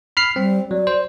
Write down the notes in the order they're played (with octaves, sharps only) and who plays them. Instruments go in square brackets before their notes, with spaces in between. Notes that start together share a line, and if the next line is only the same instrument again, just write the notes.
[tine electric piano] B5 F6 C7
[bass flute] G3 [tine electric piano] C4
[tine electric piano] F#3 [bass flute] D5
[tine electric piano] C5